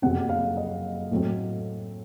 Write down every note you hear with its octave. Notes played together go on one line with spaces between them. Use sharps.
F#1 F2 C3 F#3 C4 F#5
F5
D#5
A2 F#3 A3 C4